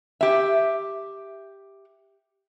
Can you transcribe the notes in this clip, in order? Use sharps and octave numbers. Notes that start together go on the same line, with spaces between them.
G4 E5